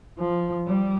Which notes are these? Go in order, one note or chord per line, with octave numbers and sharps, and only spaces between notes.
F3
G3